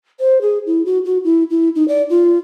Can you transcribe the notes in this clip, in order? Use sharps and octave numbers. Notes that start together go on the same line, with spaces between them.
C5
G#4
E4
F#4
F#4
E4
E4
D#4
D5
F4